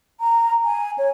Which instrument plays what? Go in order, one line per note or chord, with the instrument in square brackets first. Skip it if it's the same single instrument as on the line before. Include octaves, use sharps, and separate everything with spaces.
[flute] A#5
G#5
C#5